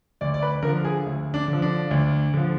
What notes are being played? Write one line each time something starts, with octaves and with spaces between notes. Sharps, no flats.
D2 D5
D5
B4
D3 F3 A#4
G#4
D2
D4
D3
F3
D4
D2
D3 F3